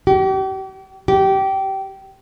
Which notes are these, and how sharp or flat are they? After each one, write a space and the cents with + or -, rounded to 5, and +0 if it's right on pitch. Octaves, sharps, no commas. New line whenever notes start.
G4 -40
G4 -20